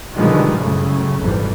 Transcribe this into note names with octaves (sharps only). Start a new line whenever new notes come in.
B2 D3 D#3 F3 G3 G#3
F#2 A2 C#3
G#1 F2 C3 E3 G3